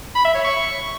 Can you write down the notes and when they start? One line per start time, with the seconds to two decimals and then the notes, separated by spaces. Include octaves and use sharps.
0.15 B5
0.25 E5
0.35 C#5
0.44 C#6